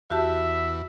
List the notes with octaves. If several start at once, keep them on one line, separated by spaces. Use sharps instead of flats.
E2 F#4 G4 E5 A5